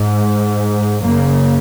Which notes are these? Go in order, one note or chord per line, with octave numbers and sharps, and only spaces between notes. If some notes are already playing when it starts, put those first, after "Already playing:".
Already playing: G#2
F#2 C#3 A#3